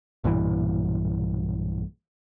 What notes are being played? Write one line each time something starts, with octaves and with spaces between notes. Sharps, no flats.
B1 G2 A#2 E3